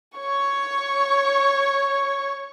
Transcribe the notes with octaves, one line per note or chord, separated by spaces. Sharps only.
C#5 C#6